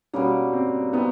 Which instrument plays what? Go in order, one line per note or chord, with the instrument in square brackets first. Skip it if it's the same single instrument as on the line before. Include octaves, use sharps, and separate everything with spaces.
[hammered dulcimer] B2 G3 A#3 [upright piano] C#4
[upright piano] C4
[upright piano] B3 [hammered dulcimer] C4 D#4